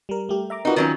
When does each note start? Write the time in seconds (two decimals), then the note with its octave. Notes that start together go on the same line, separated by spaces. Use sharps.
0.09 G3 A#4
0.29 A3 G4
0.50 E5 A#5 D6
0.65 D#4 F4 F#4 A#4 B4
0.76 D#3 F#3 C#4